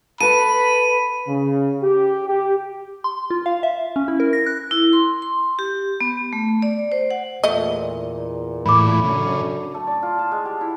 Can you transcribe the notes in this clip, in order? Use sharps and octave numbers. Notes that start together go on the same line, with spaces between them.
A4 B4 B5 C#6 D#7
C#3
G4
G4
C6
F4
F5
E5
C#4
E4
A#4
A#6
F#6
E4
C6
C6
G4
B3
A3
D5
C5
F#5
E2 A#2 A3 D#5
A2 E3 B5 D6
F#2 C#3 D4 A4
A3
D5
F4
A5
G#3
G4
E4